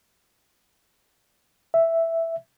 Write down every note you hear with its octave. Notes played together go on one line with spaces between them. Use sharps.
E5